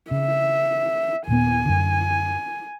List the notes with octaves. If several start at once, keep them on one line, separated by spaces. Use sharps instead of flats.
C#3 E5
D#2 A#2 B3 G#5
F#2 D3